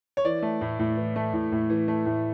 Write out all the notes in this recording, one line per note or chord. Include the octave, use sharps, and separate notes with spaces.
C#5
E3 D5
A3
A2
A2
E3
A3
A2
A2
E3
A3
A2